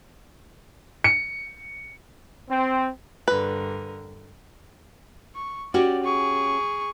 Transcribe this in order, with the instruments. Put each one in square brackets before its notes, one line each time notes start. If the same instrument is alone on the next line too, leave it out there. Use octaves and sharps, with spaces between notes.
[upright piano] C#7
[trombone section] C4
[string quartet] G2 D3 A#4 [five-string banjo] B4
[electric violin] C#6
[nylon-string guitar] C#4 F#4 G4 [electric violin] D5
[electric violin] G#4 C#6